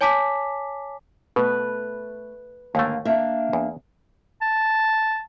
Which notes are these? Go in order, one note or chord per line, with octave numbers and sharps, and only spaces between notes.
C#5 G#5 A5 D6 B6
B2 A3 B4
D#2 G#2 D3 A3 A#3
A#3 D4 E5
E2
A5